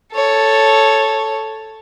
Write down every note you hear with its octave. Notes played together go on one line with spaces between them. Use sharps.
A4 C#5